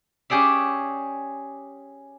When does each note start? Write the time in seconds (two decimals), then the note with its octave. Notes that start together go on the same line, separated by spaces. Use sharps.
0.30 C#4 G4 G#4 D5 E5